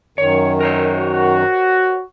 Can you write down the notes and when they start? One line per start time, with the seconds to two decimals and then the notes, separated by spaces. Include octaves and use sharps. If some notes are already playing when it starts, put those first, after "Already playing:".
0.18 F#2 D#3 C#5
0.61 A#4 C5 C#5
0.99 F#4